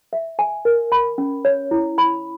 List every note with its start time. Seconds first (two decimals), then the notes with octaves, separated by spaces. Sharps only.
0.13 E5
0.39 G#5
0.65 A#4
0.92 B5
1.18 C#4
1.45 C#5
1.71 E4
1.98 B5